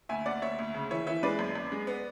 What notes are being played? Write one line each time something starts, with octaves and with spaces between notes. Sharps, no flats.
D2 E5 G#5
D2 D5 F#5
D2 C#5 E5
D2
C#3
E3 C#5 E5
E3 C#5 E5
G#3 B4 D5
F#2
F#2
G#3
B3